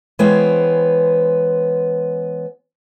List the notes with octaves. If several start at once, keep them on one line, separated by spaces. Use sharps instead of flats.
E3 G#3 B3 C5 C#5 G5